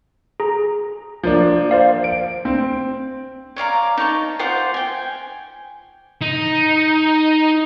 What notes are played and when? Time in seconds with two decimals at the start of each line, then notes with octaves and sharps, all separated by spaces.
0.40 G#4 A#5
1.24 F3 A#3 D4
1.71 C5 D5 F5
2.04 D7
2.45 C4
3.56 C#5 D5 F5 A#5
3.97 D#4 C#5 A5
4.39 F4 C5 F#5 D6
4.74 G5 G#5
6.22 D#4